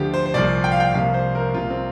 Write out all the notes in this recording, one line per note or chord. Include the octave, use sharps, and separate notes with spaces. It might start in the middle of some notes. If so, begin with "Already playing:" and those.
Already playing: D2 D3 F3 G4
C5
C5
C2 A#2 F3 D5
G5
F5
G5
C2 C3 F3 A#3 F5
C5
A#4
C2 C3 A#3 F4
C4